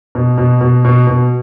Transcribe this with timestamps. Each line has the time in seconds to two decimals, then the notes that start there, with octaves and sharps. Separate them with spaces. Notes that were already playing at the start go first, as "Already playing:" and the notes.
0.15 B2
0.38 B2
0.61 B2
0.85 B2
1.07 B2